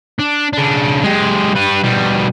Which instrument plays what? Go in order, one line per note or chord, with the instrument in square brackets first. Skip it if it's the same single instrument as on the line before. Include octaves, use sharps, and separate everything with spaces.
[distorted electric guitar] D4
C#3 D4
G#3 G4
G3 B4
B2 G3